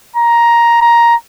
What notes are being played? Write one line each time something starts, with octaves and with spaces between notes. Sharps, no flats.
A#5
A#5